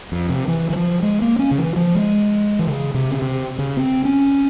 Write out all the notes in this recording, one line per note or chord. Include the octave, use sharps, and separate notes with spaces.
F2
C3
E3
E3
F3
G#3
A#3
C#4
C#3
E3
F3
G#3
E3
C#3
C3
C#3
C3
C#3
C4
C#4